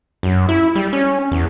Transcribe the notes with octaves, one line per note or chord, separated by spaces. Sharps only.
F#2
E4
G3
C#4
E2